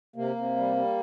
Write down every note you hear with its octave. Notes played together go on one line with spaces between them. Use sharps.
C3 A#3
C3
G3
G3